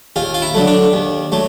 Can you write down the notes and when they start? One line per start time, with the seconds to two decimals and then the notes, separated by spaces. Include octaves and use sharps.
0.16 D#2 F4
0.34 F4
0.42 E4
0.54 D3 F#3 A3
0.67 D4
0.93 D#2
1.32 F#3 A3